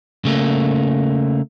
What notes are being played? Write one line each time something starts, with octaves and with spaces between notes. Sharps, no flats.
C#3 A3 A#3